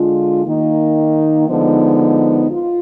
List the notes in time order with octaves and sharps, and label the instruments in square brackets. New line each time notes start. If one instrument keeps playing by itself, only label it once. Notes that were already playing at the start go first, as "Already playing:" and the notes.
Already playing: [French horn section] D3 G#3 D4 F4
D#3 A#3 D#4
D3 F3 G#3 B3 D#4
F4